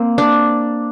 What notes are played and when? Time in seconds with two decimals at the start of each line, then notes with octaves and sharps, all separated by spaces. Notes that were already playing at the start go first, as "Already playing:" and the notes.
Already playing: A#3 C4
0.18 D4